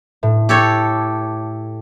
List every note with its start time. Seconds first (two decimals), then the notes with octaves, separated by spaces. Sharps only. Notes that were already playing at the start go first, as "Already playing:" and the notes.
0.23 A2
0.49 G4 A4 C#5